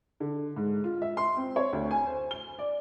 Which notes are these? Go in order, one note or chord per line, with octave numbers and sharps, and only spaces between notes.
D3
G#2
F4
E5
C6
C4
C#5
D2
G#5
C5
G7
D5